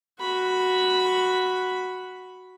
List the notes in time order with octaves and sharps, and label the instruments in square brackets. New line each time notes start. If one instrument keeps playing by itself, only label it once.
[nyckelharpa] F#4 B5